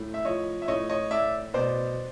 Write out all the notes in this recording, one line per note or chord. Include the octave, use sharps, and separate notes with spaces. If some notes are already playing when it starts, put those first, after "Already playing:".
Already playing: A2
E5
F3 C#5 D#5
E5
A2 C#5 D#5
C#5 D#5
A2 D5 E5
B2 C5 D5